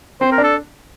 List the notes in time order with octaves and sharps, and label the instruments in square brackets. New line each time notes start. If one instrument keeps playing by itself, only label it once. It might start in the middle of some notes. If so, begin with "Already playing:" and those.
[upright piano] C4 [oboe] C5
[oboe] A#4
[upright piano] D4
[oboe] A4